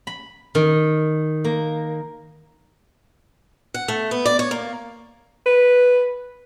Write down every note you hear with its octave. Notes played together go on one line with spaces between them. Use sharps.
B5
D#3
A#3
F#5
A3
B3
D5
C#5
A#3
B4